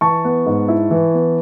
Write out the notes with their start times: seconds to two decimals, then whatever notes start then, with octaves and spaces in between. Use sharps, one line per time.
0.01 E3 A5 C#6
0.24 B3
0.46 G#2
0.68 E4
0.91 E3
1.14 B3